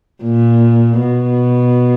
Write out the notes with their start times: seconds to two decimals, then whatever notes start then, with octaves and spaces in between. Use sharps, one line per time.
0.24 A#2
1.00 B2